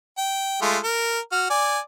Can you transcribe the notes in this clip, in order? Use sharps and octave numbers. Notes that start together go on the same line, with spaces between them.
G5
G#3 A3 F4
A#4
F#4 F6
D5 G#5